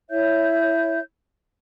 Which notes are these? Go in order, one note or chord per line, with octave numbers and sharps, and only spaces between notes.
E4 C#5 E5 G6